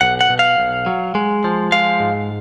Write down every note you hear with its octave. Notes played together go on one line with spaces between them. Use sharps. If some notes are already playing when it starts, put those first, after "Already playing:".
B1 F#5
F#5
B2
F5
B1
F#3
G#3
F3
G#3 F5
G#2